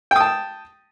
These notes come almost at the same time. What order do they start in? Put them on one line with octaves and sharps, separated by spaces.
G5 D#6 A5